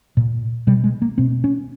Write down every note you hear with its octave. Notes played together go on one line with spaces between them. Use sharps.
A#2
B2 G3
G#3
A#3
B2 C4
C#4